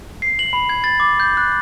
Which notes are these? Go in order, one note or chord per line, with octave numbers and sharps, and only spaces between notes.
C7
F#7
B5
G#6
A6
D6
G6
F#6